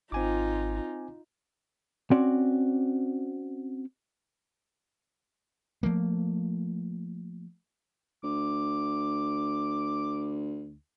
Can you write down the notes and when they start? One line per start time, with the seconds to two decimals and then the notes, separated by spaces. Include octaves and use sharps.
0.12 G#1 C4 D#4 F4 G#5 D6
2.11 C4 C#4 F#4 D5
5.83 F3 A3 A#3
8.24 D2 D6